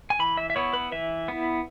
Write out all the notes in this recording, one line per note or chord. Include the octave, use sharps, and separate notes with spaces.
G#5
E3 B5
E5
E5
B3 E4 C#5
B4
E3 E5
B3 E4